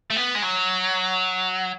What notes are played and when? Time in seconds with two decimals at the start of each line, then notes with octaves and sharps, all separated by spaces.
0.10 A3
0.16 B3
0.35 G#3
0.42 F#3